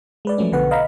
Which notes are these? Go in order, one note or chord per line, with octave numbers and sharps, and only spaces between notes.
G#3 B4 D5
F3 F#3 A3 C#4
B1 B2 D3 B4 F#5
D#5 F5 A#5 B5